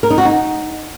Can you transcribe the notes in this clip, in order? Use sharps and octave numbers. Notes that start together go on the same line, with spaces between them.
A#4
D#4
F#4
D#4